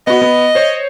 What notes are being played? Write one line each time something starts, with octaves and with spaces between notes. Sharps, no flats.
B3 F#4 D#5
B3
C5 C#5